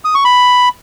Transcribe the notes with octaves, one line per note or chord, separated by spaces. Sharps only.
D#6
C#6
B5